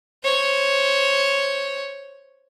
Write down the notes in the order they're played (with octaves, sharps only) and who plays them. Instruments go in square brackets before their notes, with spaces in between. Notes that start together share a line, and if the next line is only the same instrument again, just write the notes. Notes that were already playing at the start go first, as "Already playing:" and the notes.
[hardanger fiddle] C5 C#5